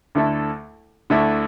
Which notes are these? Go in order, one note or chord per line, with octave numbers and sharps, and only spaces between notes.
D2 D3 A3 E4 A4
D2 D3 A3 E4 A4